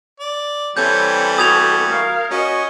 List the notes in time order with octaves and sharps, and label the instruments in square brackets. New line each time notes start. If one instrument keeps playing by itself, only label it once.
[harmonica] D5
[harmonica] E3 G3 [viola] C4 A4 [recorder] C#5 [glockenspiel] G6
[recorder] F#4 [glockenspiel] D#6 G#6 F7
[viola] A#4 F5
[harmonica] C#4 [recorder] F#4 [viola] D#5